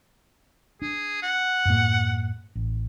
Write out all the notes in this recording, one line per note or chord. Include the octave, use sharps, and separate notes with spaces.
D4 G#4
F#5
F#2 A2 A#3
A1